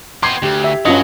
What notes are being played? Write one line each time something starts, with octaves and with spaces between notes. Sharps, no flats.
B3 G4 C6 G#6 C7
D2 G4
E5
G2 F#3 C#4 F4 D#5 A#6 C#7